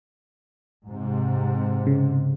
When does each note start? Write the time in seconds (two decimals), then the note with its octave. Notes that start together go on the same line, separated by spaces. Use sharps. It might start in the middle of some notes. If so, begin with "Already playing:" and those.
0.87 G#2 C3
1.87 C#3